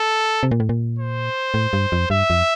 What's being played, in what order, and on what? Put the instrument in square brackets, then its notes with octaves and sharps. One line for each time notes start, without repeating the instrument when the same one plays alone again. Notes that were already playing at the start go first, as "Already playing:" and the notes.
Already playing: [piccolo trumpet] A4
[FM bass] C3
A#2
A2
A#2
[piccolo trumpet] C5
[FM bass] A2
G2
F2
[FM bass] G2 [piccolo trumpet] E5
[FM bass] F2